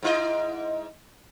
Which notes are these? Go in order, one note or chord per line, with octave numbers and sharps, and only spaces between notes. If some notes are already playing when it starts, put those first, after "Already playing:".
G#2 E4 D#5